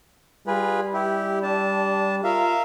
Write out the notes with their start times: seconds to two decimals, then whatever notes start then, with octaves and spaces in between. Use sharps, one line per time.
0.47 G3 F4 G#4 B4
0.93 E4 G4
1.43 D4 A5
2.24 F4 A#4 E5 F5